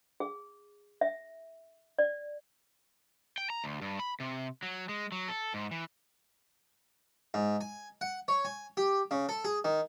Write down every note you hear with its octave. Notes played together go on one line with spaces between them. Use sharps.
G#4
E5
D5
G5
A#5
D2
G2
B5
C3
F#3
G#3
F#3
A4
G#2
E3
G#2
G#5
F#5
C#5
G#5
G4
C#3
A4
G#4
D#3